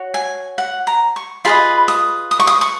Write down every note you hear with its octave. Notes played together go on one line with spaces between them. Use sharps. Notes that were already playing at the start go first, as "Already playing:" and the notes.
Already playing: F#4 C#5
G#5
F#5
A#5
C#6
F4 G#4 B4 D#5 B5
D#6
D#6
C#6
D#6
C#6